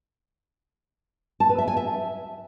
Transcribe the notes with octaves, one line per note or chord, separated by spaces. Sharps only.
A5
B4
E5
G#5
E5